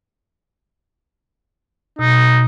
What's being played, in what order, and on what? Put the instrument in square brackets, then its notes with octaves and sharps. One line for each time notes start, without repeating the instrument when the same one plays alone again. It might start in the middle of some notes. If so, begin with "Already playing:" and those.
[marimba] B2 [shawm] D#4